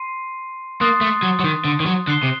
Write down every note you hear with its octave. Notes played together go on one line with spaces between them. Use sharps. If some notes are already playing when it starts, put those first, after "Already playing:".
Already playing: C6 C7 D#7
A#3 C6 D#6 F#6 A6 C7
A3
F#3
F#3
D#3
D3
D#3
F#3
D3 F#6 C7 G7
C3